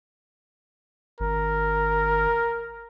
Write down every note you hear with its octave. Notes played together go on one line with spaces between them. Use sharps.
G#1 A#4